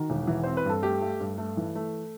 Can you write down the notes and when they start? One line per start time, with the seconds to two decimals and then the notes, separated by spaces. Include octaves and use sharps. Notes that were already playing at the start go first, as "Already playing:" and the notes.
Already playing: D#3 F#4
0.10 E1
0.27 E3
0.44 C4 C5
0.57 B4
0.65 G2 A4
0.82 A3 G4
1.01 A3
1.20 G2
1.38 A3
1.57 E3
1.75 A3